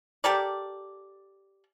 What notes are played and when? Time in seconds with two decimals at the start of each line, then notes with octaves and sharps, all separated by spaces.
0.24 G4 A4 A#4 D5